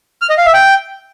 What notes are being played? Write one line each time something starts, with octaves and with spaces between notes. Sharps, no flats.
F6
D#5
F5
E5
G5